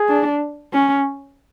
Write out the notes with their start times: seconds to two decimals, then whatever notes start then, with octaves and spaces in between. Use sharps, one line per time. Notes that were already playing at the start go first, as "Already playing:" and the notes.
Already playing: G#4
0.09 D4
0.74 C#4